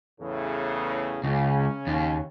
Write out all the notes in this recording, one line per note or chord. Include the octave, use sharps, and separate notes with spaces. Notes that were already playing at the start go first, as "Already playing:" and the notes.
E2 A2 C#3
C#2 C#3 C#4
D#2